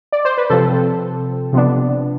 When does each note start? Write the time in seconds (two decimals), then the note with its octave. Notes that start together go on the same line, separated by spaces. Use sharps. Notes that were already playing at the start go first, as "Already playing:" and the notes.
0.13 D5
0.25 C5
0.38 B4
0.50 C3 F3 C4 A4
1.53 C3 F3 B3 D4